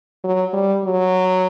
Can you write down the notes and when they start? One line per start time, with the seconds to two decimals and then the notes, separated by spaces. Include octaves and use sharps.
0.24 F#3
0.53 G3
0.84 F#3